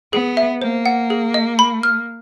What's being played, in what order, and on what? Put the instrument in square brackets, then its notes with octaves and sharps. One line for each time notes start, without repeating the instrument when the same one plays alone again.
[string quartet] B3 [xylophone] G#4
[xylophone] E5
[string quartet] A#3 [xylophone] C5
[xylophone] F#5
G#4
D#5
B5
F6